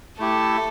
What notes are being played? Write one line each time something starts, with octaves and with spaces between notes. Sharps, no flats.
A3 E4 G4 A4